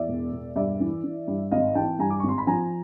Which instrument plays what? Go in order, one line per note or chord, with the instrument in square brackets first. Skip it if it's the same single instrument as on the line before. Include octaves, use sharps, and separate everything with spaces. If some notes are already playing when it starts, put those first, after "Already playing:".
Already playing: [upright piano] E2 D5 E5
E1
E1
G2 D5 E5
E3
E3
G2
G#1 D#5 F5
E3 G5 A5
G2 G#5 A#5
D6
G#1 C#6
C6
B5
F3 G#5 A#5